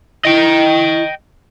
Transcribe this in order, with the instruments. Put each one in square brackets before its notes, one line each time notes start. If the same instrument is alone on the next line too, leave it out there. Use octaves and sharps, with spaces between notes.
[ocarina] E4 [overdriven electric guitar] D#5 G5